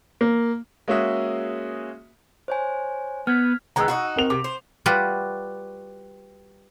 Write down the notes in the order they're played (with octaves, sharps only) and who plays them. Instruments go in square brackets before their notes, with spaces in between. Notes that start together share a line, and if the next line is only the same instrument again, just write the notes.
[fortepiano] A#3
[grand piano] G#3 A#3 C#4 F#4 G#4 E5
[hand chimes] C5 C#5 G#5
[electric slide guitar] B3 [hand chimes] F6 G#6 B6
[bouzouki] D#3 G#3 B3 [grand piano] A#5 E6
[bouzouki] D#4 F4 F#4
[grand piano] C4 A#4 F7
[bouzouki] C3 [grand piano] D6
[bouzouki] C5
[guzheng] G3 F4 F#4 B4